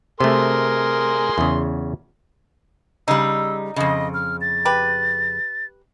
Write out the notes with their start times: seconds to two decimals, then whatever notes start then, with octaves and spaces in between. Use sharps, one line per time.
0.20 C3 A3 G#4 A#4 C6
1.38 E2 C#3
3.08 C#3 G3 D#4 E6
3.76 F2 C#3 D#5
4.14 F6
4.41 A6
4.65 G4 B4